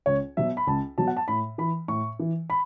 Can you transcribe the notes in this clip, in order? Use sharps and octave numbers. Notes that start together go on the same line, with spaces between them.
C#2 C#5
B2 F#3 E5
B5
C#2 A5
B2 F#3 A5
F#5
A5
A2 B5
E3 B5
A2 C#6
E3
B5